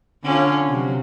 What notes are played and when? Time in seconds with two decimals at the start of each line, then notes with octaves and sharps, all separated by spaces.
0.23 D3 C#4 F4
0.67 C3 F#3